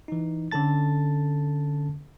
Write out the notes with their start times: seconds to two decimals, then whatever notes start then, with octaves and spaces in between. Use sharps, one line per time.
0.08 E3 D#4
0.51 D3 C#4 A4 A5 A6